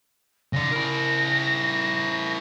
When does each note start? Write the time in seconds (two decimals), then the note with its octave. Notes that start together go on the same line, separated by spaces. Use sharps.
0.53 C#3 D5 A#6
0.71 E4 A#4